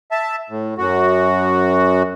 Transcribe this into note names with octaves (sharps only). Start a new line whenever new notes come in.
E5 A5
A2
F#2 F#4